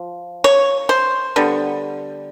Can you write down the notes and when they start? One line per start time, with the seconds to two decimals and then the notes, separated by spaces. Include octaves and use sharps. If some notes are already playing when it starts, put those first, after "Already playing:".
Already playing: F3
0.44 C#5
0.89 C5
1.36 D3 G3 B3